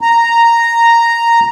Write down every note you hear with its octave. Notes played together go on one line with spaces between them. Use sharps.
A#5